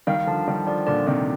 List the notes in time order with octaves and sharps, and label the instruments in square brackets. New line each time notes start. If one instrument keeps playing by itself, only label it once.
[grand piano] D#3 G3 [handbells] F5
[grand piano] D3 F3 [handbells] A5
[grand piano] D#3 G3 [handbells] A5
[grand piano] D3 F3 [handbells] D5
[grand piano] A#2 D3 [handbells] D5
[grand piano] C3 D#3 [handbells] D5